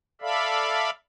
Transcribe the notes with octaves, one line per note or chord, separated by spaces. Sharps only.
A4 D5 E5 F5 B5